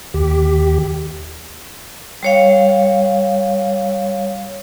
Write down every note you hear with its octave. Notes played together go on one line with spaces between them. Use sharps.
D#2 G4
G3 C#5 F5